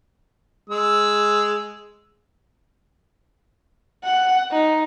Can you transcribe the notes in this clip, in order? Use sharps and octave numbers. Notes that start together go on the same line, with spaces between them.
G#3 E6
F#5
D#4